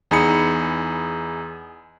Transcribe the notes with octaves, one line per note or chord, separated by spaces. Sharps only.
E2 D#4 G#4 B5 C#7